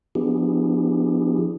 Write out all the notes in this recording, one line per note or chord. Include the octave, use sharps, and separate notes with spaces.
F3 B3 D4 E4 G4 G#4